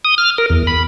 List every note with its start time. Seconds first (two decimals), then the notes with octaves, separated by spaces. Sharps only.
0.05 D#6
0.18 F6
0.38 A#4
0.50 E2
0.67 B5